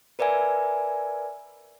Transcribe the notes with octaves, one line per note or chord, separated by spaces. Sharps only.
A#4 B4 D5 E5 G#5